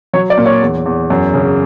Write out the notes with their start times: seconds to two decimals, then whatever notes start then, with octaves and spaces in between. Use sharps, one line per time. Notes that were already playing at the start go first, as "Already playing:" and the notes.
0.13 F#3 C#5
0.30 D5
0.37 A#2
0.46 C#5
0.62 E2
0.86 E2
1.10 F#2
1.34 C#3